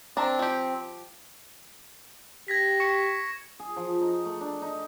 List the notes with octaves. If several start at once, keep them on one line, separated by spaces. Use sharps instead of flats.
C4 D4 A#4 A5
F3 G4
G4 G#6 A#6 B6
C#6 C#7
G#4
F3
D#4
A3
D4
D#4